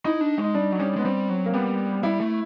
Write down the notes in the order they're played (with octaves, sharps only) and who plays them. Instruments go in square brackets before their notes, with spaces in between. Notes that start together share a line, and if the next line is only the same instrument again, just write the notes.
[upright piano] D#4 [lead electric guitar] E4
[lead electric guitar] D4
G#3
[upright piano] D#4
[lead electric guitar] G3 [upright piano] D4
[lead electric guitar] F#3
[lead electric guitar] G3 [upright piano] C#4
[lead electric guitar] G#3 [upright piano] B3
[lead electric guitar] G3 [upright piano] C4
[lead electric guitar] F#3
[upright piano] A#3
[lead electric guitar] G3 [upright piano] B3
[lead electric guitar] G3 [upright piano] E4
[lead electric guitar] A3